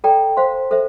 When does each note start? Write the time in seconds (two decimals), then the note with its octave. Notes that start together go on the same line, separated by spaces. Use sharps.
0.04 A4 D5 G5 A#5
0.37 C5 F5 C6
0.71 A4 C5 E5